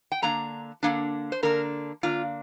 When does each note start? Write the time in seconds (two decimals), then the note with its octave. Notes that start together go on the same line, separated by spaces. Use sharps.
0.12 G5
0.22 D3 A#3 D4 A#5
0.83 D3 A#3 D4
1.32 C5
1.43 D3 A#3 D4 A#4
2.03 D3 A#3 D4 F4